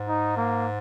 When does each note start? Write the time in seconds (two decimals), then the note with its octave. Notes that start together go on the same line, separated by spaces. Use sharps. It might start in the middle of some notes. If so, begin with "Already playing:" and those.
Already playing: G#2
0.09 D#4
0.37 A#3